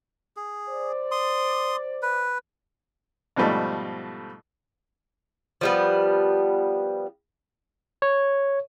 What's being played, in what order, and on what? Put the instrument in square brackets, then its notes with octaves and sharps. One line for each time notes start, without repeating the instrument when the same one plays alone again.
[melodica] G#4
[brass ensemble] C5 D5
[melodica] C6 D#6
B4
[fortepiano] G#2 B2 F3 G3 A3
[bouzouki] F3 G3 B3
[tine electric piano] C#5